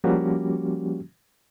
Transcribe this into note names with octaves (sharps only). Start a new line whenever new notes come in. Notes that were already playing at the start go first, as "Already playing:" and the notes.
F3 G3 A#3 C#4 F#4 G4